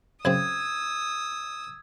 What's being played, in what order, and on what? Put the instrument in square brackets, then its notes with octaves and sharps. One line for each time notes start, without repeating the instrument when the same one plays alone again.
[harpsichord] F#2 C#3 C4 [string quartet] D#6 E6 [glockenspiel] G#6